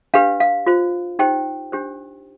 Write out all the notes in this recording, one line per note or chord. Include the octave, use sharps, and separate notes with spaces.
D4 G4 B4 F5
F5
F4 C5
D#4 G4 C5 G5
D4 G4 C5